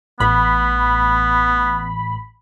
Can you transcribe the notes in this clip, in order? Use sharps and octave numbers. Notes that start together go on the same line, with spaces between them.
A1 B3 B5